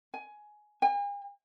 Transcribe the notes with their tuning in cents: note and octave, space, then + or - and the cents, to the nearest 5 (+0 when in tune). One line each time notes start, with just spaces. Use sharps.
G#5 +15
G#5 -45